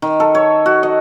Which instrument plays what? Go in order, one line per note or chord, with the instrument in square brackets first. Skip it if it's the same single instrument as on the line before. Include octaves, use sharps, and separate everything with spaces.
[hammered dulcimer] D#3
A4
C#5
F#4
D#5